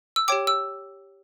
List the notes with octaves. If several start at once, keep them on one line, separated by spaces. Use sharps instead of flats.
E6
G4 C#5 G5 D6
E6